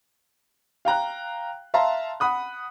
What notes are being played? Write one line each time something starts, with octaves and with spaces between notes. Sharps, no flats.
F5 G5 A#5 F#6
E5 F5 A5 A#5 C6
F#5 B5 D#6 F#6